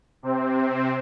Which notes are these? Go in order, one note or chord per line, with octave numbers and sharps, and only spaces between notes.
C3 C4